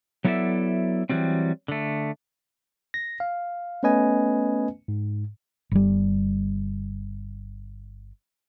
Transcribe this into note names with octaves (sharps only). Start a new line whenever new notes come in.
F#3 B3 E4 A4 D5 E5
E3 F#3 G3 C4
D3 A3
A#6
F5
A3 B3 C#4 B4 D#5 G#5
G#2
G1 G3